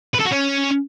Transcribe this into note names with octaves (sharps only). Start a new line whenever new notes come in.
B4
A4
F#4
C#4